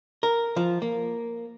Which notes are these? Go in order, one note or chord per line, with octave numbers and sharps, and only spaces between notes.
A#4
F3
A#3